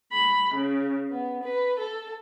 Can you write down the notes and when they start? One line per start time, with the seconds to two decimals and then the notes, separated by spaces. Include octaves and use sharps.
0.12 B5
0.54 C#3
1.09 B3
1.42 B4
1.79 A4